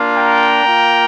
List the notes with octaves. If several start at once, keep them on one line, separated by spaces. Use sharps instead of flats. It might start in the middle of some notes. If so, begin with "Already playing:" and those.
Already playing: A#3 D4 F4
G5 A#5
A#3 F4